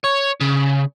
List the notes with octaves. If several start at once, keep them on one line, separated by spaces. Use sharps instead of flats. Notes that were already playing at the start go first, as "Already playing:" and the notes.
C#5
C#3